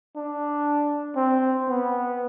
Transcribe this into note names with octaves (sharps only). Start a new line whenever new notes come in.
D4
C4
B3